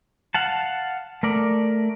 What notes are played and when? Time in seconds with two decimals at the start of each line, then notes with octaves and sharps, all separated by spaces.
0.34 F5 F#5 A5
1.23 A3 A#4 D5